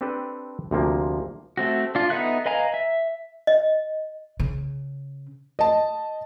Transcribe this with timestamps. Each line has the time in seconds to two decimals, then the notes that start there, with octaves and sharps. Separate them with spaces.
0.01 C4 D4 G4 A4 B4
0.71 D2 C3 F3 A#3
1.57 A3 C4 F#4
1.95 D4 F4
2.10 B3 D#4 A4 E5 F#6
2.46 B4 D#5 F5 G#5 A#5
2.74 E5
3.47 D#5
4.39 C#3
5.59 D#5 A5